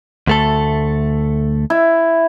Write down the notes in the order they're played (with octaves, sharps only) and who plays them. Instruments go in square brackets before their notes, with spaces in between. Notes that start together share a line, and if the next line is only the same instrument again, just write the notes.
[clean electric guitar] D2 A3 A4
[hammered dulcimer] E4